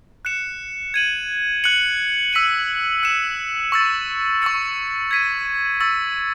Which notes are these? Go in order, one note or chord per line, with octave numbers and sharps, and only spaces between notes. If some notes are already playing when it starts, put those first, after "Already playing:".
F#6 C#7 E7
G#6 D#7 F#7
F#6 C#7 F#7
E6 B6 D#7 F#7
F#6 C#7 E7
C#6 E6 A6
C#6 E6 A6 C#7
G#6 B6 D#7
C#6 E6 A6 D#7